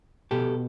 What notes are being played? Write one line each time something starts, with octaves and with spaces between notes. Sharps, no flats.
B2 G4 A4